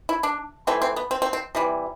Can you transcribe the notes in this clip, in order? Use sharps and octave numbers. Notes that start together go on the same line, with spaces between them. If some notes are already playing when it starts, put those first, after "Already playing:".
E4
D4
C3 E3 A3 C4
C4
B3
C4
C4
C4
C3 E3 G3